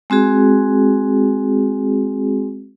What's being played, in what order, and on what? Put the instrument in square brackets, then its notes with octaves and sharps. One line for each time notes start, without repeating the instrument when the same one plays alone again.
[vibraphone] G#3 C4 F#4 G#4